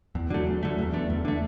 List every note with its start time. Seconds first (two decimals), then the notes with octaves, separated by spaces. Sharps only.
0.15 E2 E3
0.30 D3 F#3 A3
0.47 E2 E3
0.62 D3 F#3 A3
0.78 E2 A3
0.93 D3 A3 B3
1.10 E2 B3
1.24 D3 A3 D4